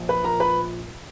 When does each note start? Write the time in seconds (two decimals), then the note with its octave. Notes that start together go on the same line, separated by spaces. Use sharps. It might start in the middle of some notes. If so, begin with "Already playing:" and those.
Already playing: A#1 A#2 F3
0.09 B4 B5
0.24 A#4 A#5
0.40 B4 B5